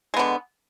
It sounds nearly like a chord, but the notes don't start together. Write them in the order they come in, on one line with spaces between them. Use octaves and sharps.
G#3 B3 D3